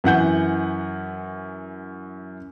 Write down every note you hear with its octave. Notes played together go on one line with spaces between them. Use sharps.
F#2 E3 F#5 G6